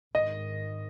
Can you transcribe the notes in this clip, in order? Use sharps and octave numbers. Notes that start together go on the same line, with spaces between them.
G#1 G#2 D#3 D#5